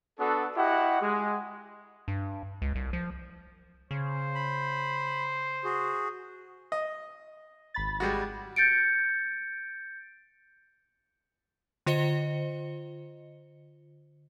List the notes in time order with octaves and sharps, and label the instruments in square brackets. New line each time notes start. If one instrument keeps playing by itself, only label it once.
[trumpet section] B3 D4 F#4 A4
E4 F#4 G4 D#5 F#5
G#3
[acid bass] G2
C#2
C2
F3
[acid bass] C#3 [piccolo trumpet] C5
[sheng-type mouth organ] B5
F#4 G#4
[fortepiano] D#5
[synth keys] G#1 B5 A6
[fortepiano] G3 G#3 F#4
[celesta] G6 A6 C#7 D7
[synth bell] D3 F4 C5 D#5 C#7 G7